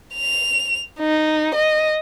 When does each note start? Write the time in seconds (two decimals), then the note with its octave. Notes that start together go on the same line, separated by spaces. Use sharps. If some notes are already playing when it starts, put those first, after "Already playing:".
0.15 F7
1.00 D#4
1.55 D#5